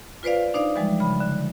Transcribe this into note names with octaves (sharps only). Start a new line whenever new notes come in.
F4 B4 C5 D5 F5
D4 D#4 C5 D5 F5
E3 F3 G3 G#3
C#3 B5
D3